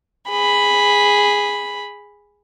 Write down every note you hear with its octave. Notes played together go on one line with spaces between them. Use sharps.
G#4 B5